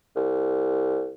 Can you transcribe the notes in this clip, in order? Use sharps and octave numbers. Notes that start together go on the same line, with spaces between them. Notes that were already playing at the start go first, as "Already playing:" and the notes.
C2